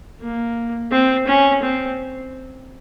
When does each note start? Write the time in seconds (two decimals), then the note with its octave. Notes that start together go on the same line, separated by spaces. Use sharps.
0.21 A#3
0.92 C4
1.27 C#4
1.62 C4